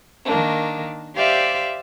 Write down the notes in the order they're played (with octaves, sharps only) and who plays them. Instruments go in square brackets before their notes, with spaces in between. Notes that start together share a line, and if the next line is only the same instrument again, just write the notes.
[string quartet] D#3 A#3 D4
G4 C5 D5 E5 F5